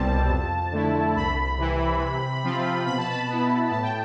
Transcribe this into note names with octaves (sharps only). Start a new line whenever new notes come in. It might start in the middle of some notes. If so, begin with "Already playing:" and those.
Already playing: C2 B2 G3 C4 A5
F2
D3 A3 E4
C2 B5
C3 E3
C3
F3 C4 F4
B2 B5
A5
B5
B3 E4
A2 A5
G5